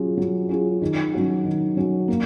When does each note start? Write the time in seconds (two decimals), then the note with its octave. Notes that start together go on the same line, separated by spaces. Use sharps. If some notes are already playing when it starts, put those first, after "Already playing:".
Already playing: F#3 C#4 F4 G#4
0.17 F#3
0.49 C#4 F4 G#4
0.82 D#3
1.14 F#3 C#4 F#4
1.44 D#3
1.77 F#3 C#4 F#4
2.08 A#3